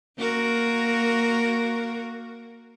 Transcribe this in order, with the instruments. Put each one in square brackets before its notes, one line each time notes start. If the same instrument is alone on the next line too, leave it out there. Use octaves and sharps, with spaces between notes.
[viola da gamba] A#3 F#4 A#4